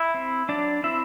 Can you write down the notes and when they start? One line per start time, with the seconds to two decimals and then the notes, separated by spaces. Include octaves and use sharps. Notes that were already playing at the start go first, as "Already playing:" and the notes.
Already playing: E4 E5
0.14 C4
0.49 F#3 D4 D5
0.83 C4 E4 E5